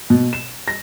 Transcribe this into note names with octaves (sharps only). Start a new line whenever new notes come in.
B2
E7
A#6